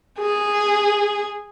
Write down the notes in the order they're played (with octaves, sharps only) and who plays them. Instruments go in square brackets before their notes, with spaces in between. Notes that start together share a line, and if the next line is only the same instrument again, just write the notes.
[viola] G#4